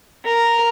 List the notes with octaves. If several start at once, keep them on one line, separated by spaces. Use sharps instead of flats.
A#4